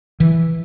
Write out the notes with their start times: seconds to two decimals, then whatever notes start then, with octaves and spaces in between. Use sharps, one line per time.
0.20 E3